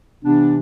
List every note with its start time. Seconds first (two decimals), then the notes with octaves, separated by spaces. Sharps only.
0.23 C3 E3 B3 D4